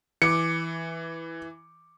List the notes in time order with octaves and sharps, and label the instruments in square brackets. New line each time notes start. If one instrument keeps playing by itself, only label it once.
[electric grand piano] E3 [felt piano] D6 C#7